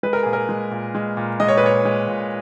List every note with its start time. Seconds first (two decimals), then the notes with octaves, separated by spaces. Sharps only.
0.03 G#3 B4
0.13 A#4
0.23 A#2 G#4
0.33 A#4
0.49 G#3
0.71 A#2
0.95 G#3
1.17 A#2
1.40 G#3 D#5
1.48 C#5
1.57 B4
1.63 A#2 C#5
1.85 G#3
2.08 A#2